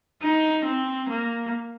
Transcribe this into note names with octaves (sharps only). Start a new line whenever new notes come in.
D#4
C4
A#3